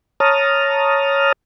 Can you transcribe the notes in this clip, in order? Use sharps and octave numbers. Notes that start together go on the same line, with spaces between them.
C#5 A5 A#5 D#6 F6